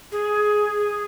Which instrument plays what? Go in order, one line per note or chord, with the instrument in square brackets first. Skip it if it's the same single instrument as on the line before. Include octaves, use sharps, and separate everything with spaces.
[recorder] G#4